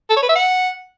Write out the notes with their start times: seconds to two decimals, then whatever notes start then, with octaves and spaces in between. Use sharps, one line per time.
0.10 A4
0.16 C#5
0.23 B4
0.29 E5
0.36 F#5